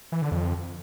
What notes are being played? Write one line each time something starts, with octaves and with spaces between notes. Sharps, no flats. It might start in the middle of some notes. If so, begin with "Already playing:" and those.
E3
D3
F2